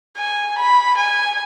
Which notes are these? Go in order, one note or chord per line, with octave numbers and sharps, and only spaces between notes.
G#5
B5
G#5